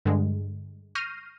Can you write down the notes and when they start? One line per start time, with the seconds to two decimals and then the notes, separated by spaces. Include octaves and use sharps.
0.05 G2 D3 G#3
0.95 C#6 F6 G6 A#6 C7 D#7